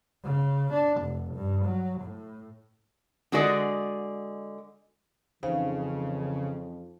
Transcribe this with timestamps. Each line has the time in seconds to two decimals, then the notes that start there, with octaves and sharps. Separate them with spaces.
0.24 C#3
0.73 D4
1.02 F1
1.35 G2
1.65 F#3
2.01 A2
3.32 D3 G#3 F#4 G#4 D5 D#5
5.43 F2 C#3 E3 D#4 C5 F5